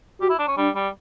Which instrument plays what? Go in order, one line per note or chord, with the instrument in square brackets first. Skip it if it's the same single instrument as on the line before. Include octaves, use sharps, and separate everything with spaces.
[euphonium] F#4 [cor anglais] G4
[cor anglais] E4
D4
C#4
[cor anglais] G3 [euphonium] D4
[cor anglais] G3